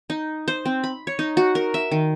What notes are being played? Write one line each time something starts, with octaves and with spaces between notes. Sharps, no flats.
D#4
C5
C4
B5
C#5
D#4
F#4
A#4
E5
D#3